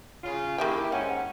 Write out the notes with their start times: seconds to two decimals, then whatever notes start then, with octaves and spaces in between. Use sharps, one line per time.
0.23 C#3 F4
0.58 D#3 A#3 E4 G4 E5 G5
0.92 G#2 C#4 F#5